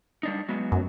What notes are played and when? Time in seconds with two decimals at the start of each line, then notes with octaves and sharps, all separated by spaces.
0.23 G3 D4 D#4
0.49 F#3 G#3 B3
0.72 F#2